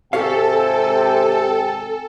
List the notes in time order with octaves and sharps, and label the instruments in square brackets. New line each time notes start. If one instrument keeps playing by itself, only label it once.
[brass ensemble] G#1 G5 G#5 [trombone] C3 [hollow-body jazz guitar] G4 C#5 F5 [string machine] A4